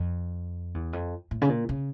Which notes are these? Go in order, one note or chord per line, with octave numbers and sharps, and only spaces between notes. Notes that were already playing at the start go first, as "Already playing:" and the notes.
Already playing: F2
E2
F2
A2
C#3
A#2
C#3